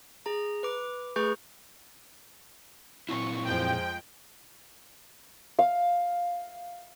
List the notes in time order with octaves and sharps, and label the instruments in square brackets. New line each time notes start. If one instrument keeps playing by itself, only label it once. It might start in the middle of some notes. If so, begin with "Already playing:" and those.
[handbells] G#4 A#5
B4 D6
A3 G#4 B4 C#6 G6
[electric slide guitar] A#2 C4 E4 [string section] C#6
[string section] F2 F3 G#3 [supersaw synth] G5
[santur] F5